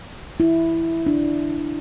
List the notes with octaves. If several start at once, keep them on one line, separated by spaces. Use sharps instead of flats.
E4
D4